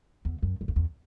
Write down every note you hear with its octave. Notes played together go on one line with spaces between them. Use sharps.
E2
F#2
F#2
F2
E2